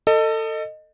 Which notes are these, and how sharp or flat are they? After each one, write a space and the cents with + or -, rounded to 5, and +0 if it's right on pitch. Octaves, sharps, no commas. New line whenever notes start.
A4 +25 D#5 -10